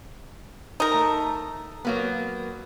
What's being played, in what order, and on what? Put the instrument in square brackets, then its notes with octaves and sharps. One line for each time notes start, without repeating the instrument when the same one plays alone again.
[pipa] D#4 A#4
[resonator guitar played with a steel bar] A3 A5
F#3 A#3 B3